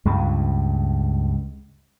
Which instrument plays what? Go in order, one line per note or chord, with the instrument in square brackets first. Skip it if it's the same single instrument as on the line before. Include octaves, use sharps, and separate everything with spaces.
[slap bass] C#2 G2 C#3